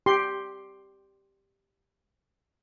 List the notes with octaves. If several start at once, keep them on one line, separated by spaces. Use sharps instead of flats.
G4 C6